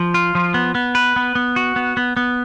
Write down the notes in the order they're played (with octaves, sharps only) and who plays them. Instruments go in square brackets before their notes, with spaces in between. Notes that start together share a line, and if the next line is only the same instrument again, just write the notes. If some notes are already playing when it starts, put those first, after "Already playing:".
Already playing: [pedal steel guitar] F3
F4
F3
B3
B3
B4
B3
B3
F#4
B3
B3
B3